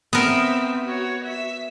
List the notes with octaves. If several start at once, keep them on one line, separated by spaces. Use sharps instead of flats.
B3 C4 A#4 E5
F#4 C#5
E5